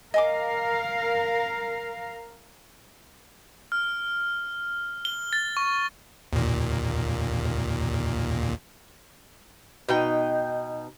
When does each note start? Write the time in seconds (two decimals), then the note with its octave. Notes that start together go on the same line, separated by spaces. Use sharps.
0.14 A#4 D#5 F5 G#5 D6
3.72 F6
5.05 G7
5.33 A6
5.57 C#6
6.33 D#2 A#2
9.89 B2 D#4 G5